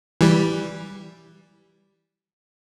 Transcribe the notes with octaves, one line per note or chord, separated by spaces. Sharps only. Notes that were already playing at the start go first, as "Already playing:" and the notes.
E3 G3